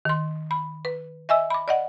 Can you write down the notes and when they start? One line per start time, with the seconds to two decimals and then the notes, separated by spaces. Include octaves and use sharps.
0.05 D#3 C6
0.51 B5
0.85 B4
1.29 D#5 E5 G#5 E6
1.50 B5 D6
1.68 D5 D#5 F#5